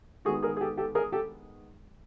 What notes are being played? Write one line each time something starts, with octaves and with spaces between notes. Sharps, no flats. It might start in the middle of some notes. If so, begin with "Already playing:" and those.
D#3 G#3 B3 F#4 G#4
G#4 A#4
G#4
G4 A4
G4 A4
G#4 A#4
G4 A4